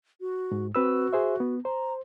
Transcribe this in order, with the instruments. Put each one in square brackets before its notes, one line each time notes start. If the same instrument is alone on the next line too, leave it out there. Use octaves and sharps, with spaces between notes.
[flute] F#4
[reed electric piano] G#2
[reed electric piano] C4 B4 E6 [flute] F#4
[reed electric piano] G#4 C5 E5
B3
[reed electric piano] C5 [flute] A#5